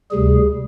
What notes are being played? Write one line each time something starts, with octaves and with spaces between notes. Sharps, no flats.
D2 C3 G3 G#4